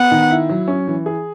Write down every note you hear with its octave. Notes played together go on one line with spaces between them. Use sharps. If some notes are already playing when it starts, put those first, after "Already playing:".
Already playing: B3 F#5
D#3
E4
F#3
C#4
E3
G#4